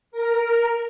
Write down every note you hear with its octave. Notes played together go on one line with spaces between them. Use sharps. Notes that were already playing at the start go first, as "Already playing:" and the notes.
A#4